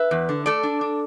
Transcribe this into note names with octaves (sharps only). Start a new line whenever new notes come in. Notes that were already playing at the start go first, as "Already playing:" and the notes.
Already playing: B4 E5
E2
D3
A3 A4 D5
D4
D4